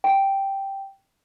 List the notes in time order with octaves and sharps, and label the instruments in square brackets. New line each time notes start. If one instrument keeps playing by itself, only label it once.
[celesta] G5